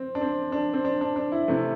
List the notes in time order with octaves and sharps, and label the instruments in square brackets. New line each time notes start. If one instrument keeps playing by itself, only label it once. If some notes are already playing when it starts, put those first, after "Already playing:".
Already playing: [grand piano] C4
D4
C4
D4
C4
D4
D4
D4
E4
C3 E3 A3